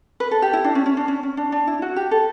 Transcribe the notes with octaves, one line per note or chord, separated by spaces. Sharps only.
B4
A4
G4
E4
D4
C#4
C#4
D4
C#4
C#4
D4
D4
E4
F#4
G4
A4